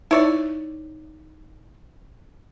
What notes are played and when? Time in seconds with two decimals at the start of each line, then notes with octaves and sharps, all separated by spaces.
0.11 D#4 E4 C#5 D5